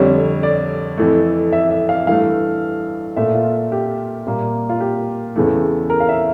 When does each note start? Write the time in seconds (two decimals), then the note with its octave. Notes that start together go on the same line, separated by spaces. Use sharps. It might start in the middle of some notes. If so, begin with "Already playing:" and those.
Already playing: F2 D3 G3 C#5
0.43 D5
0.97 F2 E3 A3
1.52 E5
1.71 E5
1.89 F5
2.07 G2 E3 A3 F5
3.16 A#2 A3 E5
3.34 F4
3.72 G4
4.27 A#2 G3 A#3
4.69 F4
4.81 G4
5.36 E2 C#3 E3 A3
5.90 A#4
6.00 F5
6.09 E5